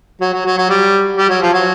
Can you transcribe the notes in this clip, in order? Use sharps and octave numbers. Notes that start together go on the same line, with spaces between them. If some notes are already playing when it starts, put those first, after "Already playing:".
F#3
F#3
F#3
F#3
G3
G3
F#3
F3
F#3